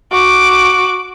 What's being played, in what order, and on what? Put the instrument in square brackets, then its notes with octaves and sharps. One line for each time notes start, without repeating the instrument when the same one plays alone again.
[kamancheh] F#4 D6